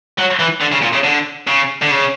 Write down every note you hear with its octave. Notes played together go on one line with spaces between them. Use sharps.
F#3
E3
D3
C#3
A#2
C#3
D3
C#3
D3
C#3